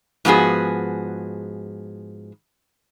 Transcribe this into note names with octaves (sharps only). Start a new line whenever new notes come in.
G#2 F3 B3 F#4 G#4